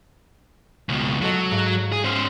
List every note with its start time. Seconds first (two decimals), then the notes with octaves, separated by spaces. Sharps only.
0.89 C#2 B2
1.22 F#3 F#4 A4 D#5
1.51 G#2 F5
1.92 G#4
2.04 C#4 C5 F#5 F6